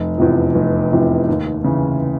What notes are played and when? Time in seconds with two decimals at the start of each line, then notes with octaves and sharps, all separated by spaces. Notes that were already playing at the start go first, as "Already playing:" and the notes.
Already playing: F1
0.18 E2 C3 F3
0.55 F1
0.91 E2 C3 F3
1.29 D#2
1.64 C#3 E3